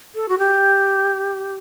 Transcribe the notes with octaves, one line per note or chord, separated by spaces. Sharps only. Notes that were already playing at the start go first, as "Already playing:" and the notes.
A4
F#4
G4